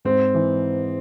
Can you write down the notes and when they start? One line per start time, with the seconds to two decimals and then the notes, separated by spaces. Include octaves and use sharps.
0.05 G#2 C4
0.34 E3